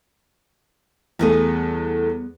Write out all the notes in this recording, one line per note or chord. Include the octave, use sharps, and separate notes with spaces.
E2 G3 A3 B3 G#4